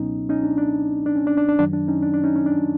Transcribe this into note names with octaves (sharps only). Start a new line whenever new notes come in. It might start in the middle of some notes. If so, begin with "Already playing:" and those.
Already playing: C#2 B2 F#3 B3 C#4 D#4
C#4 D#4
D4
D4
D4
C#4
D4
D4
D4
F#2 D#3 F#3 D4
D4
C#4 D#4
D4
D4
C#4 D#4
C#4
D4